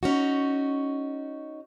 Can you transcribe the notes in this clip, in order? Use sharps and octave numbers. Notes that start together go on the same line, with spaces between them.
C#4 D#4 F#4